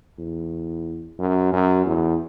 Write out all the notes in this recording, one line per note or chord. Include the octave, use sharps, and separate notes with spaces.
E2
F#2
F#2
E2